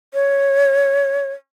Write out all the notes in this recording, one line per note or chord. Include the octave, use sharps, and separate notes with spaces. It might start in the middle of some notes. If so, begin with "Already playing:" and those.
C#5